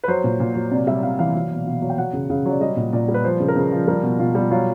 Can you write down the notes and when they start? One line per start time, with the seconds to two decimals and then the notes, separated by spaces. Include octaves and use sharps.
0.04 B4
0.08 F#3 C5
0.24 A#2
0.40 A#2
0.55 F#3
0.71 C3 D5
0.87 G3 E5
1.03 C3 F5
1.19 E3 F5
1.34 F#3
1.51 B2
1.66 B2
1.82 F#3
1.90 G5
1.98 F#3 F#5
2.13 C#3
2.30 C#3 F5
2.45 F#3 D5
2.61 G3 D#5
2.77 A#2
2.93 A#2 D5
3.08 G3
3.14 B4
3.24 F3 C5
3.40 C#3
3.48 A#4
3.56 C#3 B4
3.72 F3
3.87 G3 A#4
4.03 B2
4.19 B2 F4
4.35 G3
4.51 F#3 F4